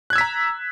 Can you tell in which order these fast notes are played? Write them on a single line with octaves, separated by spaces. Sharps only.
F#6 G#6 E6 B6 A#5